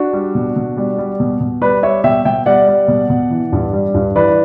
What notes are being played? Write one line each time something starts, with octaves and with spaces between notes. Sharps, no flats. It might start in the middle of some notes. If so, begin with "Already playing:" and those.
Already playing: D4 F#4
G3
B2
B2
G3
G3
B2
B2
G3 B4 D5
G3 C#5 E5
B2 E5 G5
B2 E5 G5
G3 D5 F#5
G3
B2
B2
E3
G2
G3
G2
E3 B4 D5